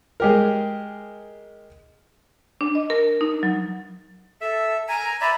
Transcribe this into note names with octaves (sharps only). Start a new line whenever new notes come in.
G#3 G4 A#4
D4
D#5
A#4
D#4
F#3
A4 E5
G#5 A#5
D5 E5 A#5 B5